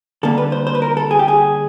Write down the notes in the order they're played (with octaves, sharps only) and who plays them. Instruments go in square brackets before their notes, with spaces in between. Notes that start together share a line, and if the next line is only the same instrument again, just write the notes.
[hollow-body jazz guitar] D3 G3 A#3 A4
B4
C5
C5
B4
A#4
A4
G#4
G4
G#4